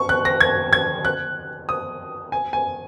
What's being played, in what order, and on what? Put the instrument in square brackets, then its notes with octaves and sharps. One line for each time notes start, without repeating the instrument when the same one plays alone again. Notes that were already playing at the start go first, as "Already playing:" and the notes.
Already playing: [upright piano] C#6
F#6
A#6
G#6
G#6
F#6
D#6
G#5
G#5